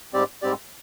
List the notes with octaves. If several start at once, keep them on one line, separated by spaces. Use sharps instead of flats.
G#2 G3 C4 G4 D5
G#2 G3 C4 G4 D5